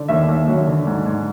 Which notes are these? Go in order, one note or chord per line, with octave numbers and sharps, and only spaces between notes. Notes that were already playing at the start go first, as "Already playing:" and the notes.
Already playing: D3
D#2 E5
D#2
F#3
D3
G#2
G#2